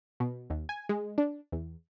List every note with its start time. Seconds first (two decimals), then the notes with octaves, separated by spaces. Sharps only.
0.20 B2
0.50 D#2
0.69 G#5
0.89 G#3
1.18 D4
1.52 E2